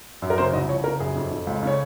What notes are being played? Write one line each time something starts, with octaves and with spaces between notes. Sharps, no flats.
F#2
A#4
C#3 C5
C2 D#5
F3 C#5
C#3 A#4
F#2 G#4
F2
F2
C#2
C#3 C#5